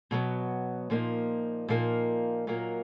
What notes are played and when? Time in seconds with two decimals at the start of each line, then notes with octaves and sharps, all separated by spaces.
0.11 B2 F#3 B3
0.90 A#2 F3 A#3 D#4
1.68 A#2 F3 A#3 D#4
2.47 A#2 F#3 A#3 D#4